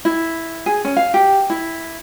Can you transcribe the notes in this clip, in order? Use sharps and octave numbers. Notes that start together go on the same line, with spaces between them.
E4
G#4
C#4
F5
G4
E4